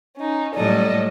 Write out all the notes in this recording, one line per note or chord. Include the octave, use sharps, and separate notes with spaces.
C#4 D#4
A2 F#3 G3 A4 D5 D#5